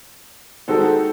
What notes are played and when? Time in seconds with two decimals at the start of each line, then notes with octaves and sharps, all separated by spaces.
0.68 D#3 G#3 C4 D#4 F#4 A4